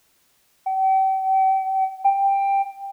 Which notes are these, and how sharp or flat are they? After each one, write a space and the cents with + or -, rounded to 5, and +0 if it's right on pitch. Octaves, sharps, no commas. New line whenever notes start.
G5 -40
G5 +10